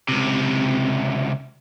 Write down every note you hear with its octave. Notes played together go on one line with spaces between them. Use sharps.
C#2 C3